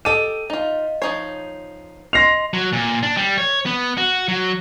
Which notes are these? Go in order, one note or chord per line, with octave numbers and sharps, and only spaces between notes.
G4 A4 D#5 D#7
D#4 F4 D#5 F5
F3 D#4 C#5 C7
D#5 C6 A#6 C7 F7
F#3
A#2
D4
G3
C#5
B3
F#4
F#3